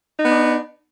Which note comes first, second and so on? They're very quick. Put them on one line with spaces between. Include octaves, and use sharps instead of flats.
D#4 B3 D4